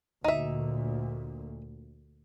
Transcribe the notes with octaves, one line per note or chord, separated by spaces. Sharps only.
D2 A#2 D#4 E5